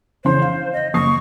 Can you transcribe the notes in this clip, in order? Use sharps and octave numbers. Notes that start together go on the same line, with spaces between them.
C#3 E3 C5 C6
F5
D#5
F#1 C#6 D#6 C7